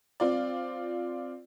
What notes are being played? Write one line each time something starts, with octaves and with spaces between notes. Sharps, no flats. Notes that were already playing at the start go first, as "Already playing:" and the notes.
C4 F4 D5